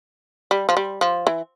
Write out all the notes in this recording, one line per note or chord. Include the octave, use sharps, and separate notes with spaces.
G3
F3
G3
F3
E3